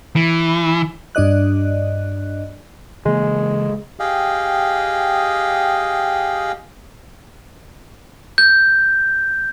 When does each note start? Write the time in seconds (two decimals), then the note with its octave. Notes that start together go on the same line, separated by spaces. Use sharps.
0.16 E3
1.15 G2 D4 D5 D#5 F#6
3.06 C#3 E3 G#3 A#3
4.00 G4 G#4 D#5 F5 G5
8.38 G6